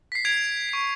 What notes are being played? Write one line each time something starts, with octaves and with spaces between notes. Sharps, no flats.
B6 C7
G#6 D7 F7
C#6 D7